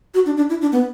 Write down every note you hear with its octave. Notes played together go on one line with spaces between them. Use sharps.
F#4
D4
D4
E4
D4
B3